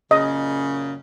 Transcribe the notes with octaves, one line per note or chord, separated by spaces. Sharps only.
F#2 A#2 C#3 D#5